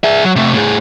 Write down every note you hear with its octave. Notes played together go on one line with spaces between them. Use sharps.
G#4 E5
F#3
C3 A3
A2 G#4